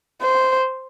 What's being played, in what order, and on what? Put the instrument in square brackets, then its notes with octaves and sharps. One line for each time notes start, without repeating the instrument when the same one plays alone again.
[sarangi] C5